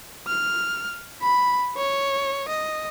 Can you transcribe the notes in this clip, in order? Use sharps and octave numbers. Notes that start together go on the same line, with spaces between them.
F6
B5
C#5
D#5